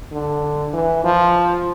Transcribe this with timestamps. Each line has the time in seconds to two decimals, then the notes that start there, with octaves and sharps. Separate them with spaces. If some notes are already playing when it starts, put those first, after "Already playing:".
0.12 D3
0.73 E3
1.04 F3